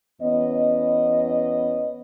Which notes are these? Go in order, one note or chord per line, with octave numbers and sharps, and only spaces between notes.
E2 B3 C#4 D#5